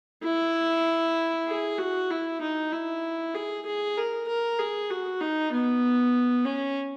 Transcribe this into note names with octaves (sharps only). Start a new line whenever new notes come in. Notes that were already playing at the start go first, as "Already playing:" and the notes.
E4
G#4
F#4
E4
D#4
E4
G#4
G#4
A#4
A#4
G#4
F#4
D#4
B3
C#4